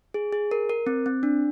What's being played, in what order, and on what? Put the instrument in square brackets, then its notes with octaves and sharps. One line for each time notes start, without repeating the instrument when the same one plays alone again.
[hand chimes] G#4
G#4
A#4
A#4
C4
C4
D4